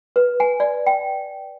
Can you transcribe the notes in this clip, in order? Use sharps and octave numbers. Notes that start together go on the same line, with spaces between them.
B4
G#5
D5
G5